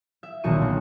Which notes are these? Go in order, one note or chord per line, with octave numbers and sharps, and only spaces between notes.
E5
D#1 B1 F#4 C#6 D#7
D3